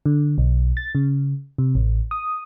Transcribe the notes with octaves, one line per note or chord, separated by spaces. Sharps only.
D3
B1
A6
C#3
C3
A1
D#6